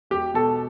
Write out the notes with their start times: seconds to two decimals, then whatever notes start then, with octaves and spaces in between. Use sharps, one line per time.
0.10 E1 G4
0.34 B2 A4